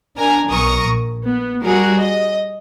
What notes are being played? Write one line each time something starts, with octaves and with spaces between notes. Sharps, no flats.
D4 A#4 G#5 A#5
B1 A#4 C#6 D#6 A#6
A#1
B3
G3 F#4 G#4 A#4
D#5